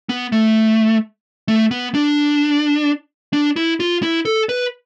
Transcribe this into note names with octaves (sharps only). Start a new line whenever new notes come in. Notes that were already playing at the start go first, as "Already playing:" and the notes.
B3
A3
A3
B3
D4
D4
E4
F4
E4
A4
B4